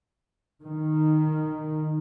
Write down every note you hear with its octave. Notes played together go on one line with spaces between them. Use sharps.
D#3